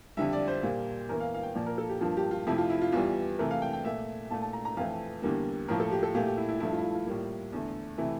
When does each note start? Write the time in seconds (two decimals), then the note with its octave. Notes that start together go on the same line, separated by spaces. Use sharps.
0.17 F2 D3 G3 E5
0.33 D5
0.48 C5
0.63 A#2 G3 A#3
1.09 E2 E3 A#3 A#4
1.20 F5
1.34 F5
1.43 G5
1.55 A#2 F3 A#3 D5
1.66 A#4
1.78 A4
1.89 G4
2.01 G2 F3 A#3 F4
2.17 G4
2.31 F4
2.47 F2 C3 F3 A3 E4
2.58 F4
2.70 E4
2.81 F4
2.92 E2 E3 G3 F4
3.39 C3 E3 A3 A#4
3.51 F5
3.62 G5
3.73 G5
3.85 A#2 A3 E5
4.30 A#2 A3 A5
4.42 A5
4.53 A#5
4.65 A#5
4.77 F2 E3 A3 F5
5.22 E2 D3 G3 A#3
5.68 A2 F3 A#3 A#4
5.80 A4
5.91 G4
6.03 A4
6.14 A#2 A3 G4
6.26 G4
6.37 E4
6.49 E4
6.60 G2 F3 A3 E4
6.72 F4
6.78 E4
6.84 F4
6.95 F4
7.06 A2 G3 A#3
7.52 E2 D3 A3
7.98 C3 E3 A3 E4